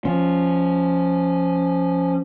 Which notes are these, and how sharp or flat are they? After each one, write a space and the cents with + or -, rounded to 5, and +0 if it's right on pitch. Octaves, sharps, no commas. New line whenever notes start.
F3 +0 C#4 +0